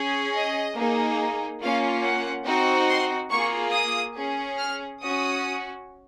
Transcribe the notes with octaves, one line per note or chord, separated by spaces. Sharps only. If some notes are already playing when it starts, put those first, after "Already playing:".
Already playing: C#4 G#4
D#5
A#3 D#4 G#4
A#3 C#4 F4 F5
F#5
C4 D#4 F#4
C6
A#3 F4 G#4 C#6
D#6
C#4 G#4
F6
C#4 F#4 D#6